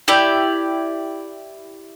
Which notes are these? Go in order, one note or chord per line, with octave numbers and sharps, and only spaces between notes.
E4 G4 D5